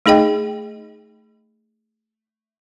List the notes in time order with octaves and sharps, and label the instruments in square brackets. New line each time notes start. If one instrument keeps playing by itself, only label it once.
[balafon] A3 D#4 G#4 D#5 G5